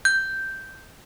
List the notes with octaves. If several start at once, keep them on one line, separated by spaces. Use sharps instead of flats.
G6